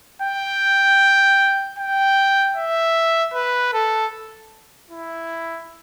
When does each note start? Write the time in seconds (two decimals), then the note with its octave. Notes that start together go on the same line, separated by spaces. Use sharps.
0.22 G5
1.78 G5
2.56 E5
3.34 B4
3.73 A4
4.91 E4